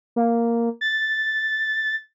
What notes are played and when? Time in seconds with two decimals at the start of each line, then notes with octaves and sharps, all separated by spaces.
0.16 A#3
0.81 A6